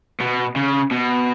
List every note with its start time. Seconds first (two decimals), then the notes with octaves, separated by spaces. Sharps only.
0.21 B2
0.56 C#3
0.91 B2